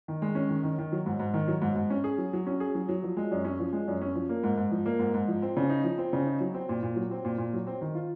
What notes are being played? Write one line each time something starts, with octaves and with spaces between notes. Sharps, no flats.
D#3
G#3
C#4
D#3
D#3
D#3
F#3
G#2
G#2
D#3
F#3
G#2
G#2
C#4
G#4
F#3
F#3
C#4
G#4
F#3
F#3
F3
G#3
F#2
C#4
F3
G#3
F#2
C#4
F3
A#3
G#2
G#2
F3
A#3
G#2
G#2
F3
C4
C#3
D#4
F3
C4
C#3
D#4
F#3
C4
A#2
A#2
F#3
C4
A#2
A#2
F#3
C4
D#3
F4